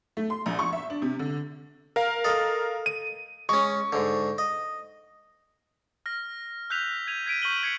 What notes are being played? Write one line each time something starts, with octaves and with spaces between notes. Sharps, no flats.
A3
C6
A#1
C#6
E5
D4
C3
D3
A#4 F5
A4 D#5
D#7
G#3 C#4 C#6
G#2 D3
D#5
F6 A#6
E6 F#6 G6 B6 F7
G#6 D#7 F7
G#6 B6 D7 D#7
C#6 F6 G6 D#7 F#7 G7
G#6 B6 C#7 D7